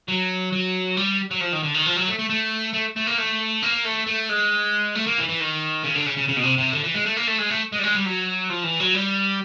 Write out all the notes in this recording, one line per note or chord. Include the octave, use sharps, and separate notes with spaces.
F#3
F#3
G3
F#3
F3
D#3
D3
D#3
F3
F#3
A3
A3
A3
A3
A3
A#3
A3
A#3
A3
A3
G#3
A3
A#3
E3
E3
D#3
C#3
D3
C#3
C#3
C#3
B2
C3
C3
D3
E3
G#3
A3
A#3
A3
G#3
A3
G#3
G3
G#3
G3
F#3
F3
E3
F#3
G3